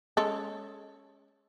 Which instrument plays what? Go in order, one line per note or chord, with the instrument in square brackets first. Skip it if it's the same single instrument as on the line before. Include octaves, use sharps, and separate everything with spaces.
[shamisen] G#3 C#4 A4